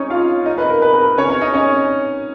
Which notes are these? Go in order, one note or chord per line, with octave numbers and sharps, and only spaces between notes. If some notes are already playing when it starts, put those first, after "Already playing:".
Already playing: C#4 D#4 C#5 D#5
F4 F5
D#4 D#5
B4
A#4
B4
B4
C#4 C#5
C#4 C#5
D#4 D#5
C#4 C#5